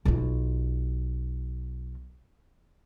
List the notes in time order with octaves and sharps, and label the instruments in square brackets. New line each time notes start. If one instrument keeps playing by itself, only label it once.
[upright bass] B1 F4